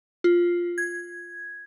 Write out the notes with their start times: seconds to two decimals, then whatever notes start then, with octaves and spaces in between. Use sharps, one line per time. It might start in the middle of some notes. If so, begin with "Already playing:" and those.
0.24 F4
0.78 G#6